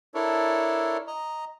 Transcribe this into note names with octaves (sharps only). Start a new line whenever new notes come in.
D4 E4 A4 A#4 C#5
D#5 A#5